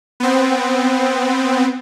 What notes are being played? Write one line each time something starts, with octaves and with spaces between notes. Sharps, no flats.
B3 C4